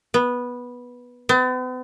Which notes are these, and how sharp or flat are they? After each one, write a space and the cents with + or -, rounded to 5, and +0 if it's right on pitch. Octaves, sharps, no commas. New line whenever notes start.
B3 -10
B3 +45